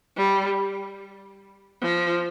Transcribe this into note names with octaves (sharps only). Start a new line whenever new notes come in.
G3
F3